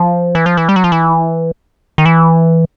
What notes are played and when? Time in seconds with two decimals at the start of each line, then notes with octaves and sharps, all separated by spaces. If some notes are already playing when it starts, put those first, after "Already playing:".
Already playing: F3
0.35 E3
0.46 F3
0.57 E3
0.69 G3
0.76 F#3
0.84 F3
0.92 E3
1.98 D#3
2.05 E3